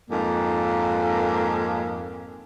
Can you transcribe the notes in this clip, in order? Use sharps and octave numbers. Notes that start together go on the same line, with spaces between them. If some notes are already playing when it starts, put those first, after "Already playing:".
F2 G#2 A#3